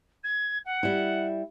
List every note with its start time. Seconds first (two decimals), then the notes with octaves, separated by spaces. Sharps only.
0.23 G#6
0.65 F#5
0.83 G3 E4